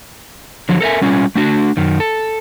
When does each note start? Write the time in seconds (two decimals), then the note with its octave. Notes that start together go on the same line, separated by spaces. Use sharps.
0.69 D3 F3 F#3
0.81 A4 A#4 E5 G#5
1.02 G3 C#4 F4
1.35 A3 D4 F#4
1.77 F#2 D#3
2.00 A4